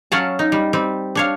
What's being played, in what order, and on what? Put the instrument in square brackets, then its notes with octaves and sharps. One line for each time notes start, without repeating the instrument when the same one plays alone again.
[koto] F#3 C#4 F5 F#5 A5
D#4
G3
G3 C4
D4 C#5 F5